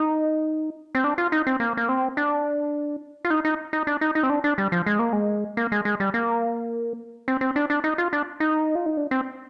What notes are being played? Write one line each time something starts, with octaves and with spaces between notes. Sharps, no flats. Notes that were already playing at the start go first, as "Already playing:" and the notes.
Already playing: D#4
C4
D4
F4
D#4
C4
A#3
A#3
C4
D4
F4
D#4
D#4
D#4
D4
D#4
D#4
C4
D4
D4
G3
F3
G#3
A#3
G#3
A#3
G#3
G#3
G3
A#3
C4
C4
D4
D4
D#4
F4
D4
D#4
F4
D#4
D4
C4